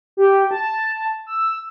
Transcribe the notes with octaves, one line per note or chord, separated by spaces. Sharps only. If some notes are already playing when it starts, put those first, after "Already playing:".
G4
A5
E6